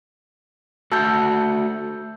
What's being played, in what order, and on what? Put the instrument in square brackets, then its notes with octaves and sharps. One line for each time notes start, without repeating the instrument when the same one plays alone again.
[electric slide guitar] A3 F#4 A5 [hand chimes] E6 G6